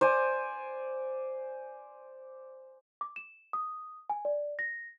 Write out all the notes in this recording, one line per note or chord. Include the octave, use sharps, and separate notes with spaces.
C5 D5 G#5
D6
E7
D#6
G#5
D5
A#6